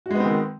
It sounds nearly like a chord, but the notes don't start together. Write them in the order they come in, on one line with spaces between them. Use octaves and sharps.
F#4 G#3 B3 C4 D#3